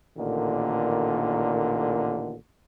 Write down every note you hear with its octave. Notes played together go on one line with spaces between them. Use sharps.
A1 A#2 D3 D#3